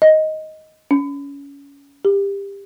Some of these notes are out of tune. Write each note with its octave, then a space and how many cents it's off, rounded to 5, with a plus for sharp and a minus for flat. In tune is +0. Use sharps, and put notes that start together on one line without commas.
D#5 +5
C#4 +25
G4 +20